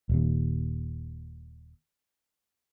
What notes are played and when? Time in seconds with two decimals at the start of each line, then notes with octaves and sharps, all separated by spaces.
0.09 D#1 D#2